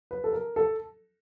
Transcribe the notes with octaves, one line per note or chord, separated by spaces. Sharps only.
B4
A4
A#4
A4